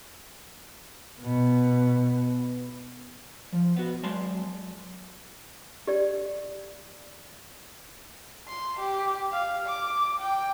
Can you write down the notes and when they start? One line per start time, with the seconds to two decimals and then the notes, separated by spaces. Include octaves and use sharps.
1.21 B2 B3
3.52 F3
3.76 B3 F#4
4.03 F#3 G#3 A5 C6
5.87 G4 D5
8.48 C6
8.80 G4
9.32 F5
9.67 D6
10.20 G5